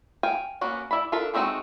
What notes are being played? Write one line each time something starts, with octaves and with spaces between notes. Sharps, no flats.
F5 G5 G#5
A#3 B3 C#4 F#4 F#5
E4 D5 B5
D4 F4 A4 A#4 E5
G#3 A3 C4 D#4 F#4